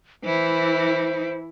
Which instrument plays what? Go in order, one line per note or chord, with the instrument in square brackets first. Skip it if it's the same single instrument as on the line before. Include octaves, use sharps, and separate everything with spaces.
[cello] E3 E4 [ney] C5